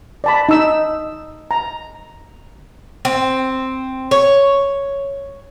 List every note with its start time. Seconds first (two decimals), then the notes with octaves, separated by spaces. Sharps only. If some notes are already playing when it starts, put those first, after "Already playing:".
0.24 D5 A5 B5
0.49 D#4 E6
1.51 A#5
3.05 C4
4.11 C#5